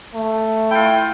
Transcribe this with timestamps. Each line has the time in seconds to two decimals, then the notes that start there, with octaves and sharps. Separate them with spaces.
0.15 A3
0.71 E4 F4 G5